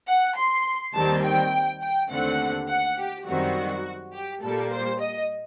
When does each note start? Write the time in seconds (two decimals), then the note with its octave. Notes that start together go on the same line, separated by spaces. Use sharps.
0.08 F#5
0.37 C6
0.95 D#2 D#3 G3 C4 A5
1.25 G5
1.82 G5
2.11 D#2 D3 A3 C4 F#5
2.69 F#5
2.98 G4
3.27 F#2 D#3 G3 C4 F#4
4.13 G4
4.42 A#2 G3 A#3 A4
4.71 C5
5.00 D#5